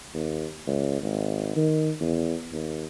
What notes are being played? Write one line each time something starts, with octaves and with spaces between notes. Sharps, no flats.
D#2
C#2
G#1
D#3
E2
D#2